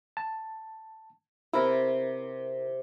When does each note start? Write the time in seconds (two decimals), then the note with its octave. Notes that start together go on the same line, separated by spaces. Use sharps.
0.17 A5
1.53 C3 E4 A#4